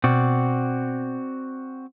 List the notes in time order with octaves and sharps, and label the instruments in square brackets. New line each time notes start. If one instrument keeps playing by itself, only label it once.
[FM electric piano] B2 [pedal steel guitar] C4 F#4 D5